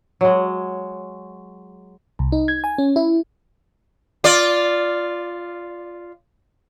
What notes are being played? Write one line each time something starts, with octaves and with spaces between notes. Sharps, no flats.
F#3 G#3
C2
D#4
G#6
G#5
C#4
E4
F4 D5